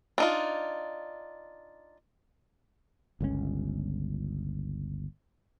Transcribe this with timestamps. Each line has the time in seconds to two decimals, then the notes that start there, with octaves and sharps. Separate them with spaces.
0.18 D4 D#4 F4
3.21 G1 C#2 B2 C#4